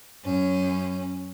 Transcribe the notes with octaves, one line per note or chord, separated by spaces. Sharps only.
F#2 C#4